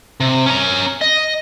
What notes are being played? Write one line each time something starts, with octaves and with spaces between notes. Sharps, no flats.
C3
C#4 A#5
D#5